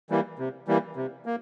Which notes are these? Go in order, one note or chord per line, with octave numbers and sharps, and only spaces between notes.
E3 G3 A#3
C3
E3 G3 A#3
C3
A#3